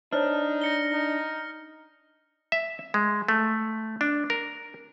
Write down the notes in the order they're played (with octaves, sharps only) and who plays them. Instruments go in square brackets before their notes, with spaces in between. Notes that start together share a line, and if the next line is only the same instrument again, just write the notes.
[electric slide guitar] D4 [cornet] D#4 [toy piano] C5 C#5 D#5 [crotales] F6
[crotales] A#6 C#7 G7
[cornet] D#4
[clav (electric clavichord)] E5
G#3
A3
D4
A#4